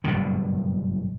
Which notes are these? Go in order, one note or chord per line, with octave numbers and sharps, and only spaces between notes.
F#1 G2 B2 D3